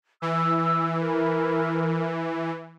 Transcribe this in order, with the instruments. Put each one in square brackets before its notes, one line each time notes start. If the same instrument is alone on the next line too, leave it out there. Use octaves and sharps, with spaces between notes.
[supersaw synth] E3 [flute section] E6
[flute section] E4 A#4